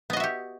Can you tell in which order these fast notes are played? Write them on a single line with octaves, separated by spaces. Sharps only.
B3 D#5 F#4 E5 G4